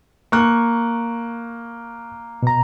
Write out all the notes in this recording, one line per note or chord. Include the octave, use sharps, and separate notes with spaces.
A#3 C#6 F#6
B2 A#5